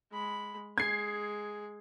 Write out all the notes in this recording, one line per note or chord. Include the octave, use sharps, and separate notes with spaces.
G#3 B5
G#3 G#4 G#6 C7